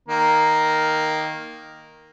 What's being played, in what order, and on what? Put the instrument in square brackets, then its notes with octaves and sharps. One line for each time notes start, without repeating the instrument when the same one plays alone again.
[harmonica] D#3 A#3 A#5